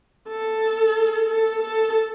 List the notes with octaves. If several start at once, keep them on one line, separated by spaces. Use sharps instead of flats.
A4
A4
A4